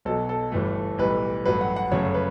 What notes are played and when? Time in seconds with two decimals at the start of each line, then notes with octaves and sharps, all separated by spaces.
0.05 B1 B2 F#3 A4
0.29 A4
0.52 G1 G2 E3 A3
0.98 B1 A2 E3 G3 B4
1.46 A1 G2 F#3 A3 B4
1.61 F#5
1.76 F#5
1.91 G1 F#2 C#3 F#3 A3 C#5
2.14 B4